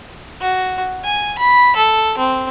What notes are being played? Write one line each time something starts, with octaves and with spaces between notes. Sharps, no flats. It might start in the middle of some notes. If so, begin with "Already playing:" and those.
F#4
G#5
B5
A4
C4